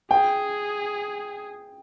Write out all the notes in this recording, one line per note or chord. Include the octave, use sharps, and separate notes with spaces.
G#4 G5